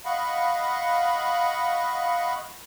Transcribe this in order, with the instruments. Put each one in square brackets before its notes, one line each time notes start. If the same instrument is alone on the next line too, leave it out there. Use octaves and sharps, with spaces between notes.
[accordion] D#5 F5 F#5 B5 C#6